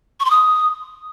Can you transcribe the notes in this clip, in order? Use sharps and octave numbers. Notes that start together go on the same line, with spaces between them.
C#6
C6
D#6